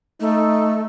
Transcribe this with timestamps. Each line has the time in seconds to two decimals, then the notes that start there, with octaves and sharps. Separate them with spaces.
0.20 A3 D#4